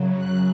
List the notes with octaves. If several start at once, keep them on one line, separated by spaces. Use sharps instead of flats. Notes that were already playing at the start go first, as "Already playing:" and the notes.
Already playing: F#2 C#3 F#3
F#6